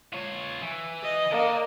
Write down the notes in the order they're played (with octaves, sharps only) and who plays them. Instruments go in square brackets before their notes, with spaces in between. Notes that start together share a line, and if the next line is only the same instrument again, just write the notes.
[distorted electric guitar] F4 C#5
E3
[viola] D#5
[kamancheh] A#3 [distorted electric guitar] D5 F#5